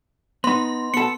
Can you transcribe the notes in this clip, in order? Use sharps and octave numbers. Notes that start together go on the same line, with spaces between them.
B3 D#4 C6
B3 A4 C#7